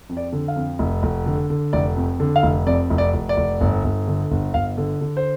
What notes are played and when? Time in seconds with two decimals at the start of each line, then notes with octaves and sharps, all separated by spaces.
0.09 F2
0.17 D5
0.33 D3
0.48 F5
0.56 F2
0.79 F1
1.03 F1
1.26 D3
1.50 D3
1.73 F1 D5
1.97 F2
2.20 D3
2.36 F5
2.43 F1
2.67 F2 D5
2.90 F1
2.98 D5
3.14 F1
3.29 D5
3.37 F1
3.61 G1
3.84 G1
4.07 D3
4.31 G1
4.54 G1 F5
4.78 D3
5.01 D3
5.17 C5